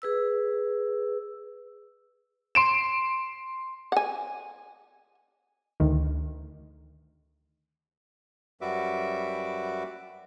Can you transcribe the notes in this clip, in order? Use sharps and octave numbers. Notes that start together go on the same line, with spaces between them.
G#4 B4 E6
C6 D7 E7
F#5 G#5
D2 D#3
F#2 G3 F#4 B4 E5 D6